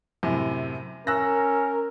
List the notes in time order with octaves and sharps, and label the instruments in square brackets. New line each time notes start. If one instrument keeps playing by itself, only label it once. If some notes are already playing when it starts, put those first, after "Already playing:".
[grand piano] F#2 A2 C3
[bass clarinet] C#4 [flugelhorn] A#4 [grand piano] E6 F#6 A#6